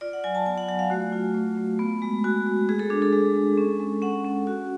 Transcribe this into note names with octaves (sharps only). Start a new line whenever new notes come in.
F4 D5
F#5
F#3 G#5
A5
B3 G#5
F#5
F#3 F#5
F5
A3 F#4
F4
A3
A3
B3
G#3
G#3 F#4
G#3
G#3 G#4
A4
D4 G#4
A4
G#3
G#3
C#4
G#3
C#4 F#5
C#4
F#4